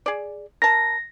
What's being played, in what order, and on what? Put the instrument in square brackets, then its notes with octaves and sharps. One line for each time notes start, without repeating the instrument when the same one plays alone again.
[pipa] G#4 D5
[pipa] A#4 A5 [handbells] A#6